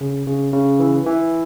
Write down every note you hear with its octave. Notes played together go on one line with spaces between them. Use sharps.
C#3
C#3
C#3
E3
E3